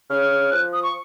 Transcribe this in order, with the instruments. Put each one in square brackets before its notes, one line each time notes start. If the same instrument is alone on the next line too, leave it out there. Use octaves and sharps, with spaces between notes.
[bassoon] C#3 [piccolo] F6
[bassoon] F3 [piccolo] F#6
[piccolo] D#6
C#6